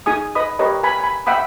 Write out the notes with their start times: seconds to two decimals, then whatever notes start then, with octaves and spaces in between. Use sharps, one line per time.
0.06 D#4 G#4 G#5 D#6
0.35 B4 D#5 B5 D#6
0.59 G4 A#4 B4 C#5 D#5 A#5
0.83 B4 G#5 A#5 B5
1.00 G#5 B5
1.26 E5 F#5 G5 B5 D#6